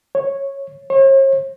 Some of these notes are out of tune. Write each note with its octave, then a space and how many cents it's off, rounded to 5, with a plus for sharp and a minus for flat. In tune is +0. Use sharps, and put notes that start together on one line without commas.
C#5 -10
C#5 -45